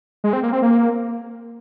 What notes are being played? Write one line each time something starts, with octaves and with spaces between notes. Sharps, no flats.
G#3
C4
A#3
C4
A#3